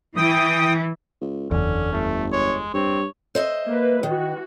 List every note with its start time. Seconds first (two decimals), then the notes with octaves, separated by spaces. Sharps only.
0.17 E3 G5 D#6
1.21 C#2
1.51 F#1 E2 D3 C#4
1.93 G1 A3
2.32 G#3 C#5
2.74 G2 C4 C#5
3.35 C5 D#5 E5
3.67 A#3 B4
4.03 D#3 E3 F#4